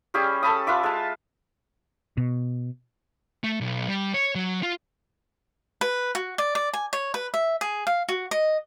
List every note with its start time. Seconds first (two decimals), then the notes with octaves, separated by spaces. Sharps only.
0.14 G3 C#4 G4 G#4
0.43 A4 A5 B5 D#6
0.67 F4 B4 E5 D6
0.83 G#3 A5
2.17 B2
3.44 A3
3.61 B1
3.88 G3
4.14 C#5
4.35 F#3
4.63 F4
5.81 B4
6.15 F#4
6.38 D5
6.55 D5
6.73 G#5
6.93 C#5
7.14 B4
7.34 E5
7.61 G#4
7.87 F5
8.09 F#4
8.31 D#5